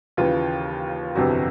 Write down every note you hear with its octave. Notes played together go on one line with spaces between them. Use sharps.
D#2 C#3 E3 F4
G1 F2 C3 E3 F#4